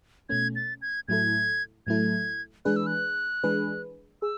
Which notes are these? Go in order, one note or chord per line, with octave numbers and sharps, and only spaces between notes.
B2 A3 C#4 G#6
A6
G#6
A2 F#3 A3 E4 A4 G#6
A2 F#3 A3 E4 A4 G#6
E3 G#3 D4 G#4 B4 F#6
E6
F#6
E3 G#3 D4 G#4 B4
G#4 E6